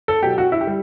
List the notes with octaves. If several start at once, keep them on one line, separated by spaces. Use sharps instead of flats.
A4
B2 F#3 G4
F#4
E4
G4
G3